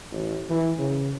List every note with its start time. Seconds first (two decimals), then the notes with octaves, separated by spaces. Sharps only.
0.11 A1
0.49 E3
0.79 C#3